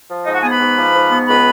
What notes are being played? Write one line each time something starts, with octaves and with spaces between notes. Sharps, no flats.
F3
G#2 D#4 D#5
F#4 F#5
B3 G#4 G#5
B4 B5
G#2
F3
G#2
B3
C#2 B4 B5